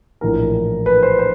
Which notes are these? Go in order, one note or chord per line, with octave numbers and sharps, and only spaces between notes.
A#1 A2 E3 A#4
B4
C5
C5